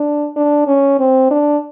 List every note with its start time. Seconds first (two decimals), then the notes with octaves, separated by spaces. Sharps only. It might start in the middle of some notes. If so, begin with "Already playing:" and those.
Already playing: D4
0.36 D4
0.67 C#4
0.99 C4
1.31 D4